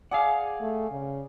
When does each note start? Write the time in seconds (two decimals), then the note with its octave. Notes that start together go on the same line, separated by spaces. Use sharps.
0.11 G#4 D5 F5 F#5
0.61 A3
0.91 C#3